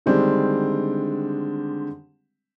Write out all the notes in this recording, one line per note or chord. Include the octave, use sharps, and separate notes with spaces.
D3 D#3 G3 G#3 C4 D4